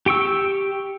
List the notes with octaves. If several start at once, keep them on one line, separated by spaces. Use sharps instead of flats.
G4 G5 C#6 E6